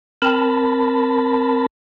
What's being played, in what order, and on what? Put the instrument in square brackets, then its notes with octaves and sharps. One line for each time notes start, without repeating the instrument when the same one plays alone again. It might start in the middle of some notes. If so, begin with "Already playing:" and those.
[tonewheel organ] C4 A#4 A5 B5